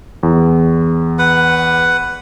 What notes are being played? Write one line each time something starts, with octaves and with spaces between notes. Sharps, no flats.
E2
B4 F#5